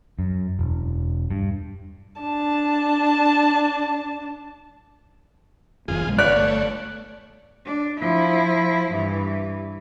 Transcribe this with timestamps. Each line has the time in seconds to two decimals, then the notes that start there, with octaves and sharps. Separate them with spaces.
0.19 F#2
0.59 E1
1.31 G2
2.21 D4 A5
5.88 F#1 F#2 E3 F4 G#4
6.07 B1 C3 G#3
6.19 G1 B4 C#5 D5 F5 F#6
6.36 A3 C#5
7.65 D4
8.00 F3 E4
8.91 G2 E3